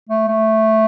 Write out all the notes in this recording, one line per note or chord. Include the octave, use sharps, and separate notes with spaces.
A3
A3